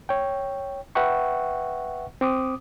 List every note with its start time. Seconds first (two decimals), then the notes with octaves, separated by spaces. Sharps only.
0.09 C#5 G5
0.95 B4 E5 F#5 G5 C#6
2.21 C4 D6 D#6